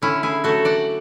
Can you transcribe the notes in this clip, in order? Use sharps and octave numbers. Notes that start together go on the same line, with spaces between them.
D3 C#4 E4
E4 G#4
F#3 A3 F#4 A4
D5 F#5